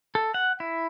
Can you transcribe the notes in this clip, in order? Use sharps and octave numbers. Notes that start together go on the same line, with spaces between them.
A4
F#5
E4